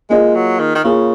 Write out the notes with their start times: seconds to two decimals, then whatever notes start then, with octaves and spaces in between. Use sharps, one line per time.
0.10 G#3 A#3 F4 G#4 D#5
0.35 F#3
0.59 D#3
0.75 D#3
0.84 C#3 A#3 F4 G#4